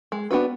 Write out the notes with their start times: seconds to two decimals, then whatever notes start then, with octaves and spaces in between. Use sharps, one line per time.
0.12 G#3
0.31 B3 D4 F#4 B4